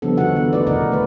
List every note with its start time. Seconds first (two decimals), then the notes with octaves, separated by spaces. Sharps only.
0.02 C#3 F3 G3 B3 D4 A4
0.17 D3 D#3 F3 D#4 F#4 F#5
0.36 B3 A4
0.53 A3 D#4 E4 F#4 B4 D5
0.66 B2 D3 D#4 A#4 D5 F#5
0.92 A3 B4